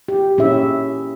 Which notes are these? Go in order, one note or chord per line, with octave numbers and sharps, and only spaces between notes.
G4
A#2 C#4 E4 G#4 E5